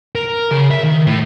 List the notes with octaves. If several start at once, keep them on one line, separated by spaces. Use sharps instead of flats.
A#4
C#3
E5
D#3
A2